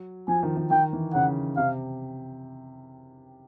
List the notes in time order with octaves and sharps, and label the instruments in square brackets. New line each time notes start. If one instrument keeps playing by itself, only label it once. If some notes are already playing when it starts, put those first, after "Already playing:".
Already playing: [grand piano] F#3
[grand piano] F3 [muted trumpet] G#5
[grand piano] D#3
D#3
[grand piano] D#3 [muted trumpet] G5
[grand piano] E3
[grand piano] C#3 [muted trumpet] F#5
[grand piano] C3 [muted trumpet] F5